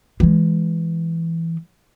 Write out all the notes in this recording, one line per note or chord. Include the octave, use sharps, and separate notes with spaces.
E3 G#3